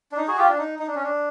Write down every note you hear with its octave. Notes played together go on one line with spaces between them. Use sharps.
D4
D#4
F#4 G#4
F4 G4
D4
D#4
D#4
D4
C#4
D4